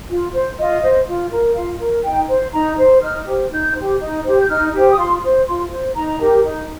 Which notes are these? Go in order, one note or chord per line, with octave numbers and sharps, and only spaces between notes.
F4
C5
F4 D#5
C5
F4
A#4
F4 F5
A#4
D#4 G5
C5
D#4 A#5
C5
D#4 F6
G4 C5
D#4 G6
G4 C5
D#4
G4 C5
G6
D#4 F6
G4 C5
D#6
F4 C6
C5
F4 C6
C5
D#4 A#5
G4 A#4
D#4